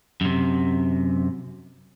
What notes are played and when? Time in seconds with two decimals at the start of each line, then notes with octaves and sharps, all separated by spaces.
0.21 F#2 C3